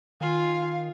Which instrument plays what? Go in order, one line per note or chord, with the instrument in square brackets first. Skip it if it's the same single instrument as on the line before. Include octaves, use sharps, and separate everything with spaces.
[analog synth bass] D#3 [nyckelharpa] F4 G#5 [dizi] F5